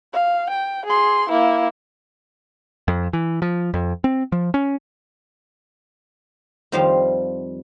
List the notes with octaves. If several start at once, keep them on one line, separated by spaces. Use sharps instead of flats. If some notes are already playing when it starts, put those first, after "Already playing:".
F5
G5
G#4 C6
A#3 E4
F2
E3
F3
F2
C4
F3
C#4
F2 D#3 F3 G3 C5 F5